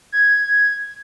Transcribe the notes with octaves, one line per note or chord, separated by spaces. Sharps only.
G#6